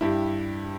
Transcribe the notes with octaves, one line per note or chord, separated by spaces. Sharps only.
G2 E4 G4